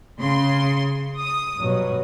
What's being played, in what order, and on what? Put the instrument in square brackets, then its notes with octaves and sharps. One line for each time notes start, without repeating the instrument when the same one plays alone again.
[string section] C#3 C6
D#6
[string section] G2 [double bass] B2 F#3